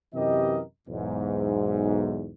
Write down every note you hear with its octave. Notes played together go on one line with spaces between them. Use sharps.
F#2 C3 E3 G4 A#4 D#5
B1 E2 G#2